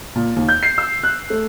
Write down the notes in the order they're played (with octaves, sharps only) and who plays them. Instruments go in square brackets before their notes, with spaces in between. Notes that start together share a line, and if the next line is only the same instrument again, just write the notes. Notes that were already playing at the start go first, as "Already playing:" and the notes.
[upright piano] A#2
D#2
G6
C7
E6
F#6
A3